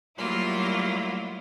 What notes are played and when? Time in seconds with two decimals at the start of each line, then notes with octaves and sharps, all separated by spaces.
0.17 F#3 G3 A3 A#3 E4 F4